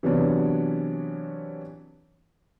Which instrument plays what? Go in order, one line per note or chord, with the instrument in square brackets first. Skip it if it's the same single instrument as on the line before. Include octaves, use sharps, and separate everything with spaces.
[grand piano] C3 E3 F#3 B3 C#4 D4